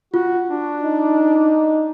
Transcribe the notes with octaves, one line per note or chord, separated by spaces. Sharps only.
F4 F#4
D4
D#4